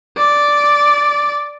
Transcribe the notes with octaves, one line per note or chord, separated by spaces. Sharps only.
D5